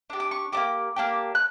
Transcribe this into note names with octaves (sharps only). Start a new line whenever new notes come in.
D4 G4
D6
C#6
A#3 D4 G4 D6
A#3 D4 G4
F#6